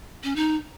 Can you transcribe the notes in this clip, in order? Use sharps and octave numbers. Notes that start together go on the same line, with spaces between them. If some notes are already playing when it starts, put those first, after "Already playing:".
C#4
D#4